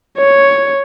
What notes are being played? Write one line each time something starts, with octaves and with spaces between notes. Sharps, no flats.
C#5